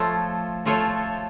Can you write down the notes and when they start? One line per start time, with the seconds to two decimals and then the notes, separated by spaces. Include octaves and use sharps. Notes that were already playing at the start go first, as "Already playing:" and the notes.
Already playing: F3 A3 F4 A4 C#5
0.65 F3 A3 F4 A4 C#5